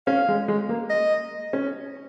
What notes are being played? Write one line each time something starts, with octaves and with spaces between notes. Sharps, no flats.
C#4 F5
G#3
G#3
A#3
D#5
C#4